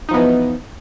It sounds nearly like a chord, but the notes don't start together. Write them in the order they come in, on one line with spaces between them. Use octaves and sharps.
D#4 F3 B3 E3